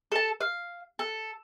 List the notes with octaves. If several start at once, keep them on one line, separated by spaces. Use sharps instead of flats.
A4 A5
F5
A4